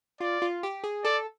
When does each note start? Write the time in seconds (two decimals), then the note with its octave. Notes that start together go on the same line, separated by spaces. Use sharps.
0.20 F4 D5
0.42 F4
0.63 G4
0.84 G#4
1.05 A4 D5